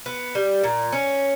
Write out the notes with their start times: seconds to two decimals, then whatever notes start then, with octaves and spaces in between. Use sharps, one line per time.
0.06 B3
0.35 G3
0.64 A#2
0.92 C#4